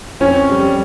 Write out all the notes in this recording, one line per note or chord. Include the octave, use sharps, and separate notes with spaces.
F2 C#4
G3